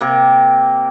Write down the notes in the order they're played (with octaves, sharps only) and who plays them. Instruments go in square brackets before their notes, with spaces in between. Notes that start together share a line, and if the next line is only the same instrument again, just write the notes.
[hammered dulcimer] C3 A#3